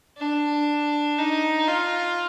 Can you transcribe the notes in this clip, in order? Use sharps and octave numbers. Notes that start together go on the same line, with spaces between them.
D4
D#4
F4